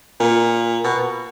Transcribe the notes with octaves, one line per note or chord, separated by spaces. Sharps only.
A#2
B2